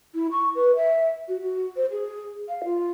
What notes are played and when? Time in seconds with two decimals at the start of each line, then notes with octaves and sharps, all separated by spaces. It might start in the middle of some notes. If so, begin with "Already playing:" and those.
0.14 E4
0.31 C#6
0.55 B4
0.76 E5
1.28 F#4
1.42 F#4
1.76 C5
1.91 G#4
2.49 F5
2.64 F4